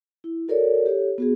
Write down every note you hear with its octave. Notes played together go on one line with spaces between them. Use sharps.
E4
F#4 A4 A#4 C#5 D5
G4 A4 C#5
B3 F#4 G#4